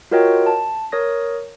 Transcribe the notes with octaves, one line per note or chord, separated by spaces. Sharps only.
F4 F#4 A#4 C#5 D#5 G5
A5
A#4 C#5 D#6 A#6